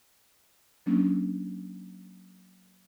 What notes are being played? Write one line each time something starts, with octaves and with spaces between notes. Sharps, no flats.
F#3 A#3 C#4 D4